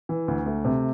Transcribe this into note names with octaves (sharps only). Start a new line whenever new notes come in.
E3
D2
A3
C3